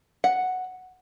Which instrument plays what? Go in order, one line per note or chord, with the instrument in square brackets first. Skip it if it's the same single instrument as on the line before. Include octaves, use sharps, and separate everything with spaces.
[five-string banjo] F#5